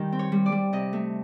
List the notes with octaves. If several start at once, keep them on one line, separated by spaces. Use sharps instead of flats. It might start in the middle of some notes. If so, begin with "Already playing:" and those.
Already playing: D#3 G3 G5
C4
C#5
G3
D5
G3
C3 D#5
A3